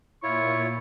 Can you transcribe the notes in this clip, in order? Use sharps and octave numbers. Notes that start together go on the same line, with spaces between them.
A#2 E4 F4 C#5 C#6